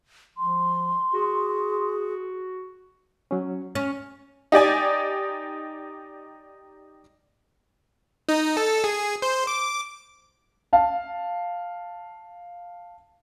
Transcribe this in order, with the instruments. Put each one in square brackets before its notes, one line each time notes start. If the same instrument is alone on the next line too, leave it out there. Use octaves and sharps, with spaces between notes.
[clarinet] F3 [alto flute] C6
[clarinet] F#4 [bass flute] G#4
[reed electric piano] F#3 C#4
[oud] C#4 [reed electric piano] F6
[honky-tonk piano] D#4 G4 D5 G#5
[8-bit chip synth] D#4
A4
G#4
C5
D6
[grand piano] F5 A5